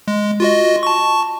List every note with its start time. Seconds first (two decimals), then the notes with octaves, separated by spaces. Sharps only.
0.08 G#3
0.40 F4 F#4 D#5
0.83 A5 C#6